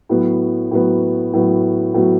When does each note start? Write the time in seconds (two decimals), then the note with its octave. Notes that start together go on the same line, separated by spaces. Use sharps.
0.09 A2 F#3 B3
0.71 A2 F#3 B3
1.33 A2 F#3 B3
1.94 A2 F#3 B3